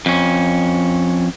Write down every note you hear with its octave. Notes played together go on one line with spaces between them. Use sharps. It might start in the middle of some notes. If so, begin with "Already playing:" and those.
F2 C#4